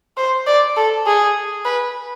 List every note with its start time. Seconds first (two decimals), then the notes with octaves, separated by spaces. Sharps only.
0.17 C5
0.47 D5
0.77 A4
1.06 G#4
1.65 B4